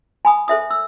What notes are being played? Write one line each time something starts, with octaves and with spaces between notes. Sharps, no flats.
G#5 B5 D#6
A4 C5 E5 D#6
E6